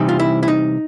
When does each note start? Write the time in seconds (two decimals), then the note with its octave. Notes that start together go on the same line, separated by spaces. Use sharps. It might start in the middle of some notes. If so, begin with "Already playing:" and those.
Already playing: C3 E3 G3 C4 D#4
0.09 F4
0.19 E4
0.43 E4
0.48 D#4